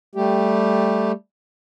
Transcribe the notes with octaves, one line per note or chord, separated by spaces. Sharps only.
G3 A3 G4